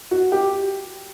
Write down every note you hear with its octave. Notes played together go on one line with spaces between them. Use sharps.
F#4
G4